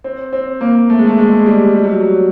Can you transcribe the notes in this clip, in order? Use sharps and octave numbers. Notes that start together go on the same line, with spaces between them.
C4
C4
A#3
A3
G#3
A3
G#3
G#3
G3
G3
F#3
F#3